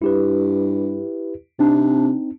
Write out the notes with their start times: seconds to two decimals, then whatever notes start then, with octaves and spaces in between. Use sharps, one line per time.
0.02 G2 E4 G4 B4
1.59 C3 C4 D4 D#4